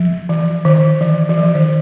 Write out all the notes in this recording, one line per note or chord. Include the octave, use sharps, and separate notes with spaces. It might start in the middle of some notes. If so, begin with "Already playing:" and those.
Already playing: F3
E3
D#3
E3
E3
F3
D#3